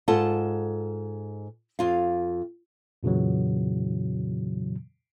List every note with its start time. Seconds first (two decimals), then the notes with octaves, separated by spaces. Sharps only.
0.08 G#2 F4 A4 F#5 A5
1.79 F2 F4 F5
3.03 F2 A#2 C#3 E3 F#3